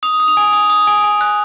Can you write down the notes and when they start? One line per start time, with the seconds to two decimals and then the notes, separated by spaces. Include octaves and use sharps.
0.03 D#6 F7
0.20 D#6
0.28 F7
0.37 G#5
0.53 D#6 F7
0.70 D#6
0.87 G#5
1.04 G#5
1.21 F#6